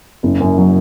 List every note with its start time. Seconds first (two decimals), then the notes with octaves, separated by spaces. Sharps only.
0.23 F#1
0.40 F#2
0.58 F#3